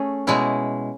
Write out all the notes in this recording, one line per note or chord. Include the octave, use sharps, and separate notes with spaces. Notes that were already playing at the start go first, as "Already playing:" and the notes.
Already playing: A3 C#4 G#4
B2 G#3 C#4 E4